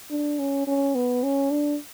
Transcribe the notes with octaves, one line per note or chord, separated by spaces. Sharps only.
D4
C#4
C#4
B3
C#4
D4